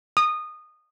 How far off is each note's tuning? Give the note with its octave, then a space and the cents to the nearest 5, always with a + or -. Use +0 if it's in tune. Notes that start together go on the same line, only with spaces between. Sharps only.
D#6 -20